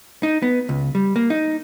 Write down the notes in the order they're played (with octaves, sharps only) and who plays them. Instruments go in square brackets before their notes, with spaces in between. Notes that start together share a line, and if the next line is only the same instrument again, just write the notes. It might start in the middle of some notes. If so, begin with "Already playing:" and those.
[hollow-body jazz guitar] D#4
B3
C#2
G3
A#3
D#4